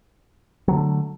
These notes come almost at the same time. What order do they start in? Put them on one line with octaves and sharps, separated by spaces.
F#3 D3 A3